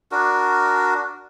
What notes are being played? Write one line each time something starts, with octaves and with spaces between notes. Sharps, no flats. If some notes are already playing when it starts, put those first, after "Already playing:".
D4 F#4 A#4